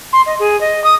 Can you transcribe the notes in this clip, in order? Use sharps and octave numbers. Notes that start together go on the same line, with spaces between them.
C6
D#5
G#4
D#5
D#6